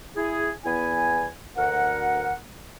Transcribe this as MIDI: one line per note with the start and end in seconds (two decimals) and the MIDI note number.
0.16 0.50 64
0.16 0.50 68
0.65 1.27 40
0.65 1.27 59
0.65 1.27 64
0.65 1.27 80
1.57 2.34 38
1.57 2.34 70
1.57 2.34 78